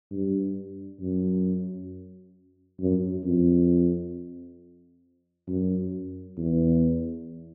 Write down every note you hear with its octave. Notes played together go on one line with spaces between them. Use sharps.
G2
F#2
F#2
F2
F#2
E2